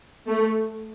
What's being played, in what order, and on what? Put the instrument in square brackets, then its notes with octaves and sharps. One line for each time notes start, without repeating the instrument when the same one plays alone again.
[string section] A3